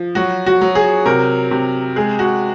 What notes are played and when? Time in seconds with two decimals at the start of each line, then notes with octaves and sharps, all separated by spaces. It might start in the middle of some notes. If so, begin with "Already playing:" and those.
Already playing: F3
0.15 F#3 F#4
0.46 F#4
0.61 F#3
0.75 G#4
1.06 C3 A#4
1.51 C3
1.96 G#3 G#4
2.19 F#4